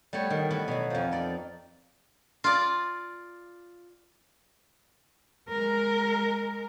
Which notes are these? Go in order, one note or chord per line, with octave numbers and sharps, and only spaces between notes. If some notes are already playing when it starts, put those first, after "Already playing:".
G3 A3 B3 F#4 C#5
D#3
E3 B3 F#4
B2 F#3
F2 F3
D#4 D5
F4 D5
G#3 A#4